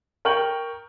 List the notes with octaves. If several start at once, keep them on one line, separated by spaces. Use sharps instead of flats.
A#4 G5 C#6 G6 F#7